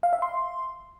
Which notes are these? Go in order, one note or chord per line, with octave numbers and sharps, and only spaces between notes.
F5
E5
C6